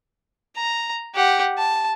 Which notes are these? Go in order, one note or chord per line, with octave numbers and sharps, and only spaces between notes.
A#5
G4 F#5
A5